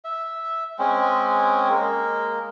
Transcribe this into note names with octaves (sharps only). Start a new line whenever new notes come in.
E5
G#3 C4 C#4
G#3 A#3 A#4